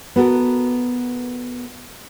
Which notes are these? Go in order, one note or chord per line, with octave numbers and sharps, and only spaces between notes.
B3 F#4 A4 A#4